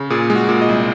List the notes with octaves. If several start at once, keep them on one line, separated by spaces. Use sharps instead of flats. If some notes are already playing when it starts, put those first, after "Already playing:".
Already playing: C#3
A#2 G#4
G#3
F#4
A#2
D#5
C2